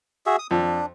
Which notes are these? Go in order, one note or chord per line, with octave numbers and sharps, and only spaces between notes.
F#4 G#4 E5
D#6
F2 D4